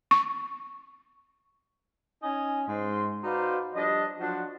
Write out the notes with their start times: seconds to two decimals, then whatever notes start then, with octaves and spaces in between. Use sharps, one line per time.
0.11 C#6
2.22 C#4 D#4 D#5 G#5
2.68 G#2 C6
3.24 D#4 F#4 B4 C5 D5 F5
3.75 F3 G3 D4 D#5
4.20 F3 F#3 D4 F4 F#4